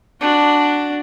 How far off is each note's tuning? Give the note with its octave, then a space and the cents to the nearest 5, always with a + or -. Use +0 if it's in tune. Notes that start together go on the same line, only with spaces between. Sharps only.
D4 +0 F#4 +0